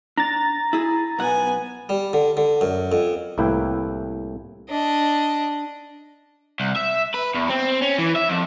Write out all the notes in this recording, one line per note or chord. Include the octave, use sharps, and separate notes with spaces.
D4 A#5 A6
E4 G#4
B1 B3 F#5 G#5
G3
D3
D3
F#2
F2
C2 A2 A#3 E4 B4 G5
D4 D#5
C2
E5
B4
E2
C4
C#4
E3
E5
F2